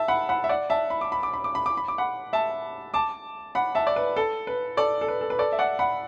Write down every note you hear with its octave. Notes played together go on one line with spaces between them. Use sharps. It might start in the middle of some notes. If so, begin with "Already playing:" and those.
Already playing: E5 A5
F#5 B5
F#5 B5
E5
D5 F#5
E5 A5
B5
D6
B5
D6
B5
D6
B5
D6
B5
D6
F#5 B5
E5 A5
A5 D6
F#5 B5
E5 A5
D5
B4
A4
B4
A4 D5
A4
B4
A4
B4
A4 D5
E5
D5 F#5
F#5 B5